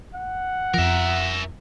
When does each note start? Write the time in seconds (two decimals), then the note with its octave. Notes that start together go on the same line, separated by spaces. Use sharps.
0.15 F#5
0.74 F2 F3 A#4 E5